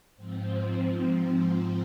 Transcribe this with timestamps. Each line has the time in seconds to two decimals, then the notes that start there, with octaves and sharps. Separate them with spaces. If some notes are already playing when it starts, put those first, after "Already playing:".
0.16 G#2 F3 C4
0.54 C4
0.91 C4